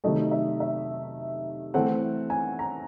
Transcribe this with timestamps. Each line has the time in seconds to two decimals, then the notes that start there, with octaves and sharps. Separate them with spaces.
0.04 C3 D#3 F#3 A3 D#5
0.31 E5
0.60 E5
1.74 E3 A3 C4 F#5
2.30 G#5
2.59 A#5